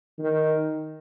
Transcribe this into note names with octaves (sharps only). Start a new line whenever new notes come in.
D#3